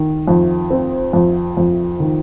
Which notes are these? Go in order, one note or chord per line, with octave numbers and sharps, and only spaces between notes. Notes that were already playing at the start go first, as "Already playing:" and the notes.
Already playing: D#3
F2
C4
F2
F2
D#3